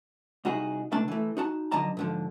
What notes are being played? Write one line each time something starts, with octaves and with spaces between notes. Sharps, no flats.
C2 D#4 F#4 G#4
C#2 C3 A3 D4 A5
E3 A3
D#4 F#4 A5
F2 D3 F#3 D#5 A5 A#5
G#2 D3 F3